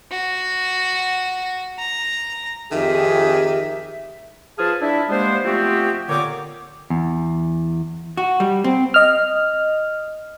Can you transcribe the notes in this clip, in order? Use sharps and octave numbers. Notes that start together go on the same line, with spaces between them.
F#4
A#5
F2 D#3 G4 G#4 E5
F3 G#4 B4 F5 A5
D4 E4
G3 G#3 A#3 B3 C5
F3 A3 B3 C4 F#4 G4
A#2 D3 B3 C#5 G5 D6
E2
F#4
G3
C4
D#5 F6